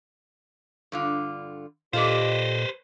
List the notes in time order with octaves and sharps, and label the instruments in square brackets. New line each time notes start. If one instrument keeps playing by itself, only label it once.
[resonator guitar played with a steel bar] G2 D3 F4
[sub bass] A#2 [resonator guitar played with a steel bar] F4 A4 D5 [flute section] G4 D#5 [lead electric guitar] B4 C5